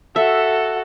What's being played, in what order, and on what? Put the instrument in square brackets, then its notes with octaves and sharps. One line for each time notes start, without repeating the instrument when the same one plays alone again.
[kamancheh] F#4 A4 [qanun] E5